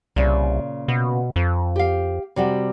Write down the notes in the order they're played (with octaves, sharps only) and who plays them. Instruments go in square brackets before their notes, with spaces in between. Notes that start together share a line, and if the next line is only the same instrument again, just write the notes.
[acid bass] C2 [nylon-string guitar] A#2 C#3
[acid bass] B2
F2
[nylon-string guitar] G4 F5
C3 G3 F#4